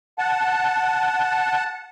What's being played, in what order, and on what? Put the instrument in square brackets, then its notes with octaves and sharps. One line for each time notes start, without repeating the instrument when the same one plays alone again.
[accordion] F#5 A5